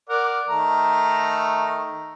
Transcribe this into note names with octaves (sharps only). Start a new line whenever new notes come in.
A#4 D5 F#5
D#3 A3 A#5